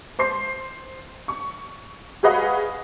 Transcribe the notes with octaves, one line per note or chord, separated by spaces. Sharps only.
C5 C6 C7
C#6
F#4 G#4 B4 D#5 F5 F#5